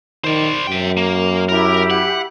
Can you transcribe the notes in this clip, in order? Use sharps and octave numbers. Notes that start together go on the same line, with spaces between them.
D#3 C5 D5
F#2 E5 G5
A#3
E4 G4 A#4 B5
F#5